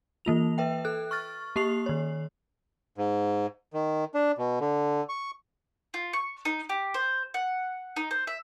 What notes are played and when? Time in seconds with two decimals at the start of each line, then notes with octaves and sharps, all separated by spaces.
0.25 E3 A#3 F4 F7
0.58 B4 E5 G5
0.85 A4 F#6
1.11 C#6 F6 A6
1.56 A#3 G4 C#6 C7 F7
1.86 D#3 C#5
2.98 G#2
3.74 D#3
4.14 D4
4.38 B2
4.61 D3
5.09 C#6
5.94 F4
6.13 C#6
6.45 D#4
6.69 G4
6.94 C5
7.34 F#5
7.96 D#4
8.11 C5
8.27 E5